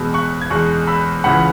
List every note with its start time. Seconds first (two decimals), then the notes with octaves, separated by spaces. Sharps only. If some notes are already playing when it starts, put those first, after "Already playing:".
Already playing: E2 B2 G#3 B5 E6
0.14 C#6 F#6
0.41 G#6
0.50 E2 B2 G#3 C#6 F#6
0.87 B5 E6
1.24 C#2 C#3 E3 F#5 B5